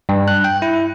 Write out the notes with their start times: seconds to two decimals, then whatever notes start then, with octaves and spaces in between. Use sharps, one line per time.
0.09 G2
0.28 F#6
0.44 G5
0.62 E4